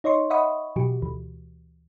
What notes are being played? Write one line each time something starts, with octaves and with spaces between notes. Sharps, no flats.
D#4 C#5 D#5 C6 C#6
D#5 E5 F#5 B5 C#6 D#6
B2 E3 F#3 F#4 G4
D2 E3